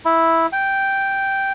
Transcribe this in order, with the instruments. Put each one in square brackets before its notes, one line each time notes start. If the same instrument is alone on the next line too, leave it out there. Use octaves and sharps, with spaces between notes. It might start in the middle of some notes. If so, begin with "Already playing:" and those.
[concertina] E4
G5